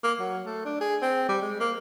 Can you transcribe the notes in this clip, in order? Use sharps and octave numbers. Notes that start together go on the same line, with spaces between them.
A#3
F#3
A3
D4
G#4
C4
G3
G#3
A#3